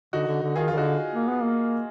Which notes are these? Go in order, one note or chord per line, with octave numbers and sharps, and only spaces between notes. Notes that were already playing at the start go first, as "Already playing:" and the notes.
D3 D#4 F#4
D3
D3
D#3 F4 G#4
D#3 F4
D3 D#4 F#4
A#3
B3
A#3